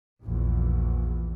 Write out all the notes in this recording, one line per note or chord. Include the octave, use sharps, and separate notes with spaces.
A#1 E2